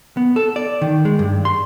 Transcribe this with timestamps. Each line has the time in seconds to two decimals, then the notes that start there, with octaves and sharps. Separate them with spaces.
0.17 B3
0.36 A4
0.56 D5
0.82 D#3
1.05 G#3
1.19 G2
1.45 C6